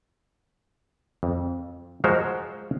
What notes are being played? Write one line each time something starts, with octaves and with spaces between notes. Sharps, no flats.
F2
F3 G#3 F#4 A#4 C5